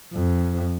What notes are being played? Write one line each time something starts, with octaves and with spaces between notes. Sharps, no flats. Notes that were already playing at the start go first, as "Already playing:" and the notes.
F2